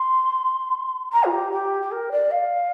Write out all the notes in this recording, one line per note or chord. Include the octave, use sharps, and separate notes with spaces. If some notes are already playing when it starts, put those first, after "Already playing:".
Already playing: C6
A#5
F4
G4
G4
G4
A#4
D5
F5